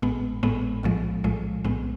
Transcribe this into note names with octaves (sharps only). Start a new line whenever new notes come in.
A1 A2 G#3 B3
A1 A2 G#3 B3
B1 A2 F3 G#3
B1 A2 F3 G#3
B1 A2 G#3 B3